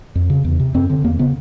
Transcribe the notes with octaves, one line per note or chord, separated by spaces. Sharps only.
F2
C#3
E2
C3
F#2 C4
D3
E2 A#3
C#3 B3